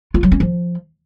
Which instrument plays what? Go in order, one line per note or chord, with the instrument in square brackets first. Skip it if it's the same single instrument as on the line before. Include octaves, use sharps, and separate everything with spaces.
[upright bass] F4
F#3
C#4
F3